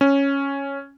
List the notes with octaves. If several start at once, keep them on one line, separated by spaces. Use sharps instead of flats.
C#4